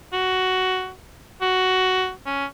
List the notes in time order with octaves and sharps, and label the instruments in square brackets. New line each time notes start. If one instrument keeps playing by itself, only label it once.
[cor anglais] F#4
F#4
C#4